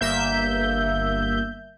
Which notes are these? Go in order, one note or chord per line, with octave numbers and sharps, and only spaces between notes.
G1 A#3 E5 G6